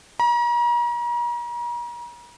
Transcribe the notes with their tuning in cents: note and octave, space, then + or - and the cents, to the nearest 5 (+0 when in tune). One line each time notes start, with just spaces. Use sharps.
A#5 +40